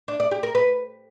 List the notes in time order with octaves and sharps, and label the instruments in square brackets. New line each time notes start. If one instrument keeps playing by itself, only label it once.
[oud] D4
D5
G4
A#4
B4